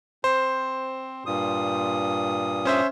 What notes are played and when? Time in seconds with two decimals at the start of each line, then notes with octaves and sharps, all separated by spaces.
0.24 C4 C5
1.26 G2 A#2 D#6
2.65 C#4 C5 E5